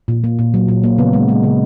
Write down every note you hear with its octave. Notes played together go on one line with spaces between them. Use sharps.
A#2
A#3
A#2
F#3
A#2
A#3
C#3 B3
G#3
G#3
C#3